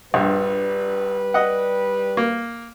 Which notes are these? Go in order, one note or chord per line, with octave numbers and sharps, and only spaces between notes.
A#1 G2 G3 B4
D#5 F#5
A#3